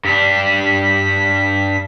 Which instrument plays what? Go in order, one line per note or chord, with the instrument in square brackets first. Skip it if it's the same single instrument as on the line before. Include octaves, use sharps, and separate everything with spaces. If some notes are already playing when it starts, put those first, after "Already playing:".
[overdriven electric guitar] G2 D4 [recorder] B6